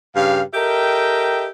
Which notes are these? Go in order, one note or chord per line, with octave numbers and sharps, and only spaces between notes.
G2 C#3 G4 F5
G4 A4 A#4 D#5 E5 G5